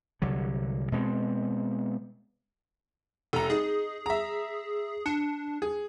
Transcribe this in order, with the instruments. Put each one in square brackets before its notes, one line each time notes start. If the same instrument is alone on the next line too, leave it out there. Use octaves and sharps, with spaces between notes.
[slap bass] C2 D3 F#3
B2 G#3 A3 C4
[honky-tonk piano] F1 G3 A#5 [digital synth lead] A4
[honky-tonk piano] D#4 [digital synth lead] G#4
[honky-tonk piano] E5 A#5
[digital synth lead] D4 [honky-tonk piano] C#7
[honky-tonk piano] G#4